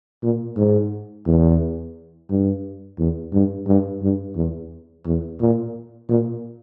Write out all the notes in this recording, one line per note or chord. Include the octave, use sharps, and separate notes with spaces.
A#2
G#2
E2
G2
E2
G2
G2
G2
E2
E2
A#2
A#2